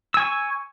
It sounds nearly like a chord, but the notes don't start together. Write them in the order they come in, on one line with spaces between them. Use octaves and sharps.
E6 G#5 C#6